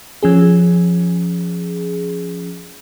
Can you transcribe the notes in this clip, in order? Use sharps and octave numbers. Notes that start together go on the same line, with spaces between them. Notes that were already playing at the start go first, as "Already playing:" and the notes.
F3 C#4 G#4